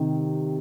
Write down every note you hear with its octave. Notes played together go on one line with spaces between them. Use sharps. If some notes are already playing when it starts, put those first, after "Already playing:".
Already playing: C3 D#3